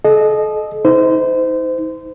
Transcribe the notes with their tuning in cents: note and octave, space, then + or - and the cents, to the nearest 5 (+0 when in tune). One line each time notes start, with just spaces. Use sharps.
A4 -40 D#5 -20
D#4 +35 C5 -30